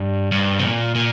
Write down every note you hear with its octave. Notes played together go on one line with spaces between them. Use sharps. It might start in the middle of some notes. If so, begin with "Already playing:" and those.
Already playing: G2
G2
C3
A#2
A#2